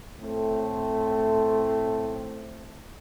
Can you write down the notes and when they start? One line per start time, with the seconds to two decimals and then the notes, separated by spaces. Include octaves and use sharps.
0.20 A2 A3 C4 A4